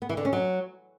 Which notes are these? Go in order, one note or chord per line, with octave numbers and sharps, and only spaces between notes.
B3
E3
D3
C#4
F#3